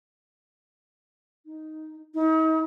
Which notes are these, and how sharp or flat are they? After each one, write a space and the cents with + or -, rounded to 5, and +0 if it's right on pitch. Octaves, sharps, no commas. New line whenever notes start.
D#4 +5
D#4 +40